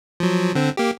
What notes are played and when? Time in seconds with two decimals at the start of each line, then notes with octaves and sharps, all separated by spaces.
0.20 F3 F#3
0.55 D3 C4
0.77 A#3 G4